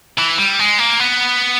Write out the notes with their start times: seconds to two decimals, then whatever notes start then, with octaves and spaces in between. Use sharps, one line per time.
0.19 E3
0.38 G3
0.59 G#3
0.79 A#3
1.00 B3